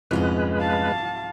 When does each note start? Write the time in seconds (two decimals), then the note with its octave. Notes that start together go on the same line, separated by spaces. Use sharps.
0.11 C2 F2 G#2 F3 G#3 C#4 B4 D#5
0.60 F5 A5